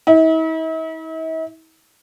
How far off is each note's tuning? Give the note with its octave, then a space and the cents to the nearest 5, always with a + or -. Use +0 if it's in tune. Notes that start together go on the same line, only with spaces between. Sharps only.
E4 -45